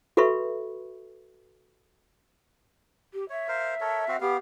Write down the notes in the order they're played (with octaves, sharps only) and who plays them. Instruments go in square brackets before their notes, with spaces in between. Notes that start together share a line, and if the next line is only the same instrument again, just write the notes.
[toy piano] F#4 A4 B4 E5 B5 C#6
[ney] G4
[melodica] C#5 [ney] E5
[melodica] A#4 C5 F5
A4 A#4 C#5
C4 F#4 F5
[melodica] B3 F5 [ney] G4